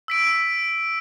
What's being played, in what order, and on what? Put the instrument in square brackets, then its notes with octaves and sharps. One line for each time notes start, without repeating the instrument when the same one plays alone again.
[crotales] E6 B6 D7